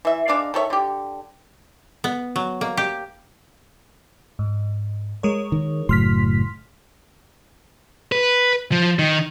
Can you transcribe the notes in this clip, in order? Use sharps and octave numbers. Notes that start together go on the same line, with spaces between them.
E3 E5
G#3 D4 D5 F5
D#3 A4 C#5 E5
D3 G4
B3
F#3
A#3
G4
G#2
G#3 A#4 C#5
D#3
F#1 A2 F#3 C6 F6 B6
B4
F3
D#3